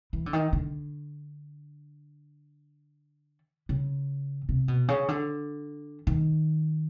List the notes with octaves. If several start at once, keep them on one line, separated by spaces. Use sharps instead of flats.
E3
D3
D#3
D3
C#3
C3
B2
C#3
D3
D#3